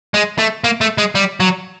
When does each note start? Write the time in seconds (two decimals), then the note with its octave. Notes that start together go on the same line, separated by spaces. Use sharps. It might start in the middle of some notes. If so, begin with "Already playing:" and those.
0.14 G#3
0.39 A3
0.64 A#3
0.81 A3
0.98 G#3
1.15 G3
1.40 F#3